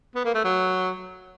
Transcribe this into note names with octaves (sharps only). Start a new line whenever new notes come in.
B3
A#3
A3
F#3